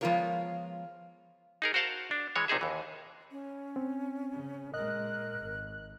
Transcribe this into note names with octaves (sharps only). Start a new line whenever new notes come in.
F3 G#3 B3 F4 A#4 C#5
D#4 G#4 A#4
F#4 A#4 C5 F5 F#5 A5
D4
E3 G#3 C#5
A#1 C3 D#4 G#4 E5
D#2 E3
C#4
C4
C#3
A#2 G#3 A#4 D#5 F#6
G#1